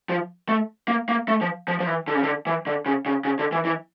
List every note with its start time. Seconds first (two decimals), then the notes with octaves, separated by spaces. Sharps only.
0.09 F3
0.49 A3
0.88 A#3
1.09 A#3
1.28 A3
1.41 F3
1.68 F3
1.80 F3
1.87 E3
2.08 D3
2.15 C#3
2.23 D3
2.46 E3
2.67 D3
2.86 C#3
3.06 C#3
3.25 C#3
3.39 D3
3.52 E3
3.65 E3